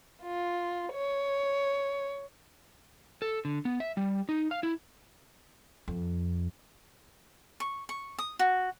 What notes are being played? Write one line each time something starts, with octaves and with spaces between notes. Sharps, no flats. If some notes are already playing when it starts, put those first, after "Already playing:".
F4
C#5
A4
D3
B3
E5
G3
D#4
F5
E4
F2
C#6
C#6
D#6
F#4